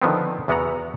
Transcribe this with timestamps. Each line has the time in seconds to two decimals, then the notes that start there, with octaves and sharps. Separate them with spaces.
0.02 D3 D#3 F3 B3 C4
0.48 E2 E3 B3 F#4 F#5 A#5